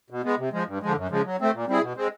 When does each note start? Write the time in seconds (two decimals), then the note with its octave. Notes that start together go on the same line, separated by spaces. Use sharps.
0.10 B2
0.24 G#3 B3
0.38 C3
0.52 F3 G#3
0.67 G2
0.81 D3 F3 G#3
0.96 F#2
1.10 C#3 F3 G#3
1.25 F#3
1.40 A3 C4
1.54 A#2
1.68 G3 C4 E4 G#4
1.81 B2
1.96 G#3 C4